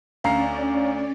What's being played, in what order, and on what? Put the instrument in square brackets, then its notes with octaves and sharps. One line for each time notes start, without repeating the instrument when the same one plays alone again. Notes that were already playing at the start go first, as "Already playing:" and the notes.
[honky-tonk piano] D2 [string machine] C#4 D5 [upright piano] F5 A#5 C7